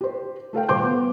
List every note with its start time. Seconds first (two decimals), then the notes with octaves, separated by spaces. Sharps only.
0.01 G4 C5
0.53 A3 A4 F5 G5
0.69 D#1 C5 C6 D6 G6
0.81 B3 B4